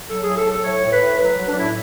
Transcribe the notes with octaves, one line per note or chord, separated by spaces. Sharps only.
F#3 A4
A2 G#4
A4
F#3
A4
A2 C#5
A2
B4
A2
F#3 B4
F#3
D4
A2 E4